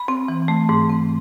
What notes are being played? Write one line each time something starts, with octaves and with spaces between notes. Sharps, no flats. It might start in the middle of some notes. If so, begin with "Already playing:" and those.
Already playing: B5
C4
E3
A3
G#2
C4